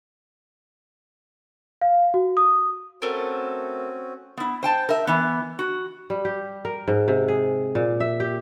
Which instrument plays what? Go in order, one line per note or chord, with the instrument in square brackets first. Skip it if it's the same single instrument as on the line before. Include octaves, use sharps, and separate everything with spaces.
[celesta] F5
F#4
D#6
[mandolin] A3 A4 A#4 [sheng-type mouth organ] C4 C#4 F#4
[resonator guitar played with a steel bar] B3 E4
C5 G5 A5
A#4 E5
E3 B3
F#4
[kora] G3
G4
A#4
G#2
C3
G#4
A#2
E5
G4